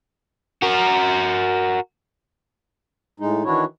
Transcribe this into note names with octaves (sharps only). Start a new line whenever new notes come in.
F#4 A#4
A2 G#3 D#4
D#3 E3 D4 E4 F#4 C#5